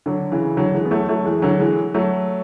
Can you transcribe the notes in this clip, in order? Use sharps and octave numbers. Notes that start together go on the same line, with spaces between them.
D3 F#3
C#3 E3
D3 F#3
E3 G#3
B3
F#3 A3
F#3 A3
E3 G#3
D3 F#3
E3 G#3
F#3 A3